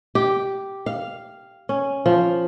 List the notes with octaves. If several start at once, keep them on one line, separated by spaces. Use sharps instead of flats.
G4
F5
C#4
F3